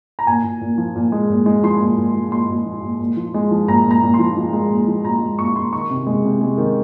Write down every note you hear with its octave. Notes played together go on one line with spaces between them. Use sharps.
A#5
A#2 G#5
A#2
A#2
F3
A#2
G#3
A#2
G#3
F3 C6
A#2
A#2
G#3
A#2 C6
A#2
F3
A#2
A#2
F3
G#3
F3
A#2 A#5
A#2
A#5
A#2
C6
F3
F3
G#3
A#2
F3
A#2 A#5
G#3
A#2 C#6
A#2 C6
D#3 C#6
C3
G#3
C3
G#3
D#3